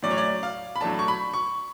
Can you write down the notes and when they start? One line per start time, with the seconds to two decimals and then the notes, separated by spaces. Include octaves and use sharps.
0.03 A2 F#3 C#4 D5
0.11 C#5
0.18 D5
0.43 F5
0.76 B5
0.81 A2 F#3 A3 D4 A5
0.99 C#6
1.08 B5
1.34 C#6